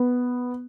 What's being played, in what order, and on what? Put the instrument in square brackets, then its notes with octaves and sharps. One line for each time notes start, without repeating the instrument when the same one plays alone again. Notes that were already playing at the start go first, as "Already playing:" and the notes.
Already playing: [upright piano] B3